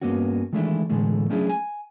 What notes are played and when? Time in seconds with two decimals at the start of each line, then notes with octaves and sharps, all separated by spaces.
0.02 G2 A#3 B3 C#4 F#4
0.53 D#3 E3 G#3 A3 D4 E4
0.90 A2 D3 E3 G#3 A3
1.29 F#3 A3 C#4 D4 E4 G#4
1.49 G#5